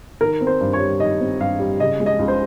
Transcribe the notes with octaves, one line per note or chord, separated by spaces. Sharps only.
D#3 A#4
C4
C5
G2
C#5
G3
D#3 D#5
C4
G2 F5
G3
C#3 D#5
G#3
D#5
C#2
C5